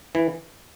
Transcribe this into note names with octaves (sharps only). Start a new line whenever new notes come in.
E3